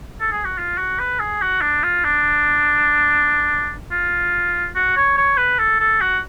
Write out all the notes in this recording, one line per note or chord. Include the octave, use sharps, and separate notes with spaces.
A4
G#4
F#4
F4
F#4
B4
G#4
F#4
D4
F4
D4
F4
F#4
C#5
C#5
B4
A4
A4
F#4